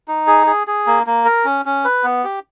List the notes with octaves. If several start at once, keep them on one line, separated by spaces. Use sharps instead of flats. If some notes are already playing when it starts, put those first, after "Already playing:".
D#4
G#4
G#4
G#4
A#3
A#3
A#4
C#4
C#4
B4
B3
G4